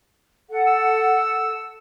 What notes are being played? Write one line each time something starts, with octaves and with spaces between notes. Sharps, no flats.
A4 F#5
E6